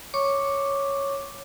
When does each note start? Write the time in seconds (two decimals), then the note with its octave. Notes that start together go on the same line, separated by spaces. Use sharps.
0.14 C#5 C#6 D6